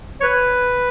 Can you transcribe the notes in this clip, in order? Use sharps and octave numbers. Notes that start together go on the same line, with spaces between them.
C#5
B4